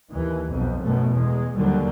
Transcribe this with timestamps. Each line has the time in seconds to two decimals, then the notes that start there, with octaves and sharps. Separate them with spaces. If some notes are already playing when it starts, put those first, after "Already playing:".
0.11 D#2 E3
0.50 B1 F2
0.82 F#2 B2 A3
1.13 E2 G#3
1.55 D#2 D3 F#3 G3